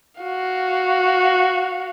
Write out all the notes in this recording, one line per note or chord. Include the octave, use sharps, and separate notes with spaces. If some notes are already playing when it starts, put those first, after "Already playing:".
F#4 F5